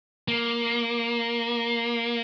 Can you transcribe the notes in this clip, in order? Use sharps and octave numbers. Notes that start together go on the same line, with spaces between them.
A#3